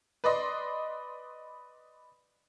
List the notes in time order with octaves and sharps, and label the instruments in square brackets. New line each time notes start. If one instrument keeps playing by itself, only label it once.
[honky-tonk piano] B4 D5 D#5 C6